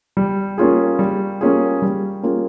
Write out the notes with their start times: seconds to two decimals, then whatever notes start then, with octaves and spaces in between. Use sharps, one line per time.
0.17 G3
0.58 A#3 C#4 F4 G#4
0.99 G3
1.41 A#3 C#4 F4 G#4
1.82 G3
2.23 A#3 C#4 F4 G#4